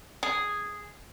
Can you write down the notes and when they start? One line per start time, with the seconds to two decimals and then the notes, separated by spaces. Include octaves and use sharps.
0.23 G#4